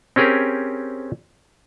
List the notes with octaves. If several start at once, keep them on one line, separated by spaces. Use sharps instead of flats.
C4 C#4 G4 G#4 A#4